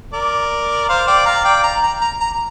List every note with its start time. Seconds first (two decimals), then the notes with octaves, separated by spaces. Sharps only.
0.14 A#4 D5
0.89 C5 F5
1.07 D5 G5
1.26 F5 A#5
1.45 D5 G5
1.64 A#5
1.83 A#5
2.01 A#5
2.21 A#5